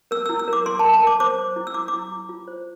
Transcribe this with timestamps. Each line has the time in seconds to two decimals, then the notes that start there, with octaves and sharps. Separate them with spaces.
0.11 A#4 E6
0.26 E6
0.29 E4
0.39 E6
0.48 A#4 D6
0.66 A#4 C6
0.79 A5
0.84 A#4
0.93 A5
1.02 A#4 D6
1.20 C5 D6
1.38 C5
1.56 E4
1.67 E6
1.74 E4 D6
1.88 D6
1.93 E4
2.11 E4
2.29 F4
2.48 C5